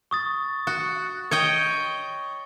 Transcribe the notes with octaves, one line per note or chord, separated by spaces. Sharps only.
C#6 D#6 A6
F#4
C#5 D#5 G5